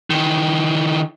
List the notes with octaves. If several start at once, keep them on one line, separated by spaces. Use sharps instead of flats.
D#3 E3